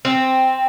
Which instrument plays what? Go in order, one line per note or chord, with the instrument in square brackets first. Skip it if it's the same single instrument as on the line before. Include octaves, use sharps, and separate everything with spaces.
[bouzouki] C4